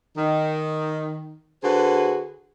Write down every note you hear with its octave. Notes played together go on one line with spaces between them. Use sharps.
D#3
D3 F#4 G#4 B4 C5